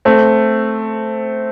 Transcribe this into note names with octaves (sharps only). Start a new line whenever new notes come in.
A3 C4